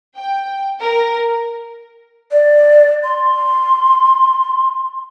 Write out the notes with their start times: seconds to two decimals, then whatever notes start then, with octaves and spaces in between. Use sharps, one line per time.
0.17 G5
0.82 A#4
2.31 D5
3.03 C6